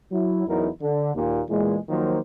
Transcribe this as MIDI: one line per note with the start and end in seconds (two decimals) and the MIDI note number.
0.12 0.47 54
0.12 0.47 64
0.47 0.68 33
0.47 0.68 40
0.47 0.68 54
0.47 0.68 63
0.47 0.68 64
0.47 0.68 70
0.81 1.11 50
1.15 1.42 39
1.15 1.42 46
1.49 1.78 40
1.49 1.78 46
1.49 1.78 52
1.49 1.78 56
1.89 2.18 51
1.89 2.18 53
1.89 2.18 54
1.89 2.18 58
1.89 2.18 65
1.89 2.18 72